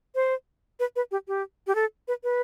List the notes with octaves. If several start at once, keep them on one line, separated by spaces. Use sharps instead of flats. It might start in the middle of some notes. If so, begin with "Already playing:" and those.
C5
B4
B4
G4
G4
G4
A4
B4
B4